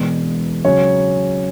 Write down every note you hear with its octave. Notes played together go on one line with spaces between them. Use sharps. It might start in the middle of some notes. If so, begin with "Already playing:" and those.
Already playing: E1 E2 B2 G#3
C#2 C#3 F#3 C#4 C#5